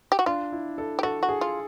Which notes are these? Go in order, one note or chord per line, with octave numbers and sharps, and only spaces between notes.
G4
F#4
D4 F4
E4
A4
G4
F#4 A4
F#4
G#4
F4